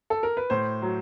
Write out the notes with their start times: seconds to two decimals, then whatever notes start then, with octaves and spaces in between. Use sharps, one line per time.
0.10 A4
0.23 A#4
0.37 B4
0.50 A2 C5
0.82 F#3